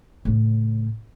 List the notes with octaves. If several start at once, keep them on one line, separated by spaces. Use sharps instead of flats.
A2 C#3